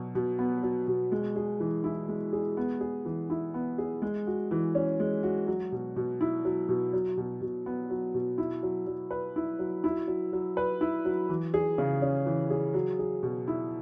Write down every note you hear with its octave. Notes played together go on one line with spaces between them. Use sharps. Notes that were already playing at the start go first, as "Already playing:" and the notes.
Already playing: B2 F#3
B2
B3
F#3
B2
G#3
G#4
E3
E4
G#3
G#4
B3
G#4
E3
E4
B3
G#4
G#3
F#4
E3
C#4
G#3
F#4
F#3
B2
B2
E4
F#3
B2
F#3
B2
B2
B3
F#3
B2
E4
F#3
F#3
B4
E4
F#3
E4
F#3
F#3
B4
E4
F#3
E3
G#4
C#3
C#4
E3
G#4
F#3
G#4
B2
E4